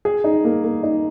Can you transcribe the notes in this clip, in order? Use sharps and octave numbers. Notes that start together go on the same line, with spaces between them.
G#4
D#4
A#3
A#3
D#4